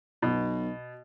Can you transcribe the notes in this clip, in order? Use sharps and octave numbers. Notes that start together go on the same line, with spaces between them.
B1 B2